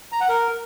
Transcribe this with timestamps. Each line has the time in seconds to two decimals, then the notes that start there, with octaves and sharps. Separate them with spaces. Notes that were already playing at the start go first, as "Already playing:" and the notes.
0.12 A#5
0.20 F#5
0.29 A#4